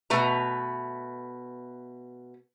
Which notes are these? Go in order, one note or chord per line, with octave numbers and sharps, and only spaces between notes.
B2 A3 B4 A#5